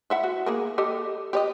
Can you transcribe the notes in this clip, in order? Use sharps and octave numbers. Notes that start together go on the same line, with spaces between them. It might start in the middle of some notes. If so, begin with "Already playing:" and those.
E4 E5 F#5
F#4
A#3 G#4 A#4
G4 A4 D#5
G4 D5 D#5